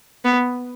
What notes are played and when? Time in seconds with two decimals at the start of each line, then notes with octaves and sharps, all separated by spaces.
0.25 B3